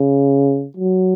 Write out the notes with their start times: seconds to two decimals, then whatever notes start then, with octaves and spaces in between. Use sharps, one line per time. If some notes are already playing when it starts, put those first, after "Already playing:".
Already playing: C#3
0.77 F#3